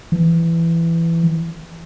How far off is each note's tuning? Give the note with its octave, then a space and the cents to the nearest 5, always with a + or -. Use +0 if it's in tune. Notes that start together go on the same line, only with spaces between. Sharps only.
E3 +15